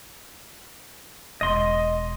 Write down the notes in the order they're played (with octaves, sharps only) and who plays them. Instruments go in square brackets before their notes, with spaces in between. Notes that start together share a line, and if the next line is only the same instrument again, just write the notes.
[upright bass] E1 [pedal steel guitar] D#5 C6